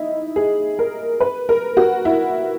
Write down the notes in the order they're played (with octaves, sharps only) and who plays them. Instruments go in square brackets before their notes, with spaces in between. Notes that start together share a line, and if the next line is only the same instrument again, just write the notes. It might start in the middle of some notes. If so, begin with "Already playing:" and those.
Already playing: [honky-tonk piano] D#4 E4
G#4
A#4
B4
A#4
F#4
E4